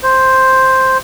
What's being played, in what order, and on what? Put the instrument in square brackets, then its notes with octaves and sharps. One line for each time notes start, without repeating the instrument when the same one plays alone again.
[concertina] C5